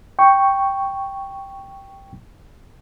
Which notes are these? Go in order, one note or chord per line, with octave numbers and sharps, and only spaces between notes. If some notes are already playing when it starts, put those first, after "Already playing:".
G5 C#6